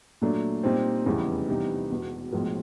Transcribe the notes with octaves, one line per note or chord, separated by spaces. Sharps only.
A#2 F#3 A3 D4
A#2 G3 C4 D#4
F1 E2 C#3 E3 G3
C3 E3 G3 B3 D#4
E1 E2 B2
B1 A2 F3 G#3